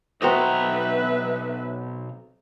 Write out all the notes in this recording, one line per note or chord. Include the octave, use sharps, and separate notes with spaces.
B1 C4 F#4 B4 D#5 E5 A#5